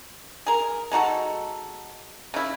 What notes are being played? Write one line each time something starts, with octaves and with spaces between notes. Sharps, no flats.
G#4 A#4
G#3 D#4 F#4 A4
C#3 E4